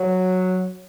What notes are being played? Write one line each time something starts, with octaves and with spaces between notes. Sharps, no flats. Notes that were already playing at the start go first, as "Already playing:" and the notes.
Already playing: F#3